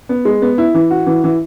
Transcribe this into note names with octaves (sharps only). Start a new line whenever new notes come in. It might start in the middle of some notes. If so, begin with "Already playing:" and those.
B3
G#3
B3
E4
E3
F#4
E3
E3